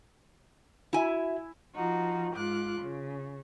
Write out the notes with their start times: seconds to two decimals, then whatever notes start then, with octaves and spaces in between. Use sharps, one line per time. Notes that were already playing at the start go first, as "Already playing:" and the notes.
0.93 E4 F#4 E5 G#5
1.75 F3 D#4 F4 F#4
2.35 G#2 F4 D6 F#6
2.80 C#3